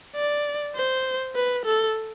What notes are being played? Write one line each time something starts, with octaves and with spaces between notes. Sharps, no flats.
D5
C5
B4
A4